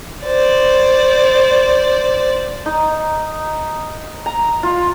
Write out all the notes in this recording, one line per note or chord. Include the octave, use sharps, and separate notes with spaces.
C5 D5
D#4
A#5
F4